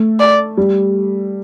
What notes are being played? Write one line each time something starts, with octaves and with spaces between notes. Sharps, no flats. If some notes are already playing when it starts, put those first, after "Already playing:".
Already playing: A3
D5
G3